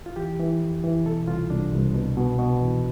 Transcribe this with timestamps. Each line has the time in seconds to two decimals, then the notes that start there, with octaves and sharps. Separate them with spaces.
0.06 F4
0.16 E3 G4
0.39 E3
0.61 F2
0.84 E3
1.06 B2 A4
1.27 C2 F4
1.50 C2 D4
1.73 C2
1.94 B2
2.17 B2
2.39 B2
2.61 E2